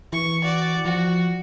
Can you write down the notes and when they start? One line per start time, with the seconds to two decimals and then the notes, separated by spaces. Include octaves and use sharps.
0.13 E3 C#6
0.44 F#4 D5
0.85 F3 F#4